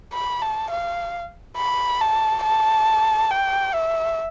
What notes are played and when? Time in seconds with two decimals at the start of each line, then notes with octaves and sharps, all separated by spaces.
0.13 B5
0.42 A5
0.70 F5
1.57 B5
2.01 A5
2.44 A5
3.31 G5
3.74 E5